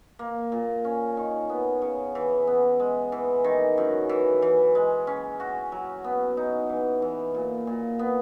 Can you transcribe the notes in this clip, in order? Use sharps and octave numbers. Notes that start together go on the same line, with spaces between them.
A#3
A#2
C#4
D#3
B3
C#3
E3
B3
G#3
E3
D#3
F#2
E3
E3
G#3
C#4
F#4
F#3
B3
D#4
E3
E3
A#2
A#2
B3